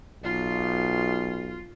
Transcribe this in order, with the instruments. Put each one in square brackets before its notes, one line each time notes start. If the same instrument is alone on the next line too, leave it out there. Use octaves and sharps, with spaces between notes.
[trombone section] B1 [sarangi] F4